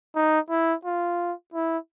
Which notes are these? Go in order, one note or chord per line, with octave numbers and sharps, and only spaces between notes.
D#4
E4
F4
E4